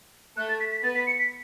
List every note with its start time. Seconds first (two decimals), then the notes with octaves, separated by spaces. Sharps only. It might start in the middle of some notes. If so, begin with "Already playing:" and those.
0.36 A3 A4 F#6
0.49 A6
0.60 B6
0.72 B6
0.83 B3 B4 A6
0.95 B6
1.07 C#7
1.19 B6